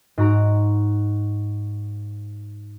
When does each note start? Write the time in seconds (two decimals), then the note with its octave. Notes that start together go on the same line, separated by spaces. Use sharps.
0.18 G#2 F#4 A#5 D7